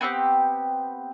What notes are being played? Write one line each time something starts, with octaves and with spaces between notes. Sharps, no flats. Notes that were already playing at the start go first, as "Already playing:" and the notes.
B3 C4 D#4 G4